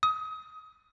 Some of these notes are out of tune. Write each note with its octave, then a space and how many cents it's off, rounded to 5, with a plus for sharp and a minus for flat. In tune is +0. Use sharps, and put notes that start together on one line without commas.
D#6 +25